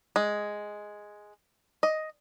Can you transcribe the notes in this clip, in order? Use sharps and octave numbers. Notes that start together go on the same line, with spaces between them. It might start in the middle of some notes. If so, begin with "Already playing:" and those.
G#3
D#5